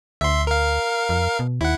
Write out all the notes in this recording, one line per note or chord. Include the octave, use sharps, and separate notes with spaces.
D2 E5 C6
A#4 F5
F2
B2
D#2 E4 F#5